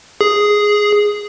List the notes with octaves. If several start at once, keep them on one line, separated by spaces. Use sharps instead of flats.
G#4